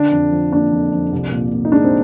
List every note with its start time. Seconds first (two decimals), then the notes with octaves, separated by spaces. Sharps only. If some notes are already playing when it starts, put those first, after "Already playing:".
Already playing: D3 D4
0.12 F2
0.32 F3
0.52 A#3 D4
0.72 F2
0.92 F2
1.12 C2
1.32 A#2
1.52 A#2
1.65 D#4
1.72 G#3 D4
1.84 C4